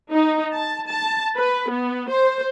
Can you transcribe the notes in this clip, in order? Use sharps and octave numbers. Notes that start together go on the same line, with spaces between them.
D#4
A5
A5
B4
B3
C5